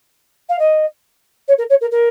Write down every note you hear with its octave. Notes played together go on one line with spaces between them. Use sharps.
F5
D#5
C#5
A#4
C#5
A#4
A#4